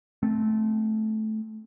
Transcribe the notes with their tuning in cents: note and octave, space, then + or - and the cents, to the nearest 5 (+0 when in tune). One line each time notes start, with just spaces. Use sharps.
A3 -15 C4 +0